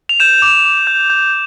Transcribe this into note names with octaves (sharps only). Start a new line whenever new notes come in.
F7
G6 E7
D6
D6
G6
G6